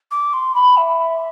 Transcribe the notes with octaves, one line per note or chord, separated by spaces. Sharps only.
D6
C6
B5
E5